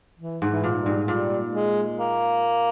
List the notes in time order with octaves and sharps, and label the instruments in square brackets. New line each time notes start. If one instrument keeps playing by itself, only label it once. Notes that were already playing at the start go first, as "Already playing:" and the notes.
[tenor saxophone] E3
[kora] G#2
[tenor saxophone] E3
[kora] A#2
[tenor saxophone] G3
[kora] G#2
[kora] A#2 [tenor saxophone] G3
[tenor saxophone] G#3
A#3